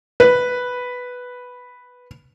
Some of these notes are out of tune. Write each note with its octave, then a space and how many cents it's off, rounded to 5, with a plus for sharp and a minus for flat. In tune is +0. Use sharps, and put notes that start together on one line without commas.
B4 +0